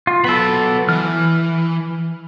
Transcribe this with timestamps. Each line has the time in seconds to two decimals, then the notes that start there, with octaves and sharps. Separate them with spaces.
0.07 F4
0.24 F#3 B3 A4 B5
0.89 E3 F6